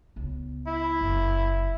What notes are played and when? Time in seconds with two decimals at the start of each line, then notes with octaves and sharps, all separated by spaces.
0.16 C#2 B3
0.67 E4
1.01 F#1